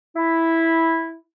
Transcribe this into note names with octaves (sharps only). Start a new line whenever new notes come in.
E4